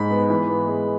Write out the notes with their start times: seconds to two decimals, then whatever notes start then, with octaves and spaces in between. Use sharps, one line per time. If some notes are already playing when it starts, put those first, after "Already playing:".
Already playing: G#2 G#3 B5
0.11 B3
0.30 E3
0.50 B3
0.68 G#3